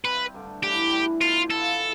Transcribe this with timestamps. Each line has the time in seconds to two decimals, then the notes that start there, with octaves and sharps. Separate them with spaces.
0.05 C3 G3 C4 B4
0.34 G2 D3 A3
0.63 A2 E3 B3 D4 G4
0.92 E3 G3 D4
1.21 B2 A3 E4 F4
1.50 F3 B3 E4 A4
1.79 E3